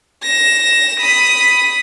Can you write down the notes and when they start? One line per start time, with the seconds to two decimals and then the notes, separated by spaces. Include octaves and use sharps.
0.24 A#6 E7
1.00 B5 D#6